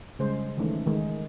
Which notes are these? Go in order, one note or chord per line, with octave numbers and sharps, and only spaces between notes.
C#3 G3 G#3 C5
D#3 E3 G#3 A3 C#4 D#4
D#3 G#3 A#4